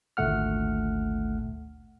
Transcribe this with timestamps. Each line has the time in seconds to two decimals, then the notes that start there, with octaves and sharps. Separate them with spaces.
0.17 G#1 D2 A#2 A3 F#5 F6